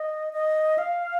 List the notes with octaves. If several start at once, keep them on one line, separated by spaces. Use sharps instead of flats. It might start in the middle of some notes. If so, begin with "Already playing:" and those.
Already playing: D#5
D#5
F5